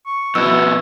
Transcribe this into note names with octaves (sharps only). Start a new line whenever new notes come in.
C#6
F2 B2 E4 E6